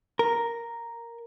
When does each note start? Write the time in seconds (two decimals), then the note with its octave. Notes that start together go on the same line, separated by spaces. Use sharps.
0.19 A#4